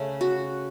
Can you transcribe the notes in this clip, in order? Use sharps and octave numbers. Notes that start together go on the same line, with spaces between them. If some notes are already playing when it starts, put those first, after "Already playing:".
Already playing: C#3 A3 C#4
F#4